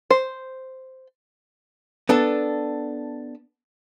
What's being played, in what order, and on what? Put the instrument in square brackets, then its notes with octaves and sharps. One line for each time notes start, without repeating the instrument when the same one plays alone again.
[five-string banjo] C5
[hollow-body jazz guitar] B3 D4 A4